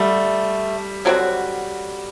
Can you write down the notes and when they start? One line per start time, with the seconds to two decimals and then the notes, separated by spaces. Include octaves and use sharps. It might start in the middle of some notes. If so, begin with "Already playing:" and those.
Already playing: D3 G3 A3
1.05 D3 F#3 C4 F#4